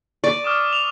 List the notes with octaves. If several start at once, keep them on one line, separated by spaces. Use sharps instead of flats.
D5 C#6
D6 D#6 F6
F7